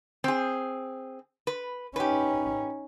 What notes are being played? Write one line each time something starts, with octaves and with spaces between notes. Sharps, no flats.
C4 G#4
B4
C#4 D#4 G4 B4